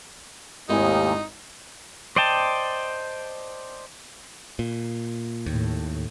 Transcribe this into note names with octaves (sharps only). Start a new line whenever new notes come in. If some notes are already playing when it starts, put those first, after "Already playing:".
G#1 D#2 A3 D#4 E4 G4 G#5
C5 D5 D#5 G5 A5
A#2
D#2 A2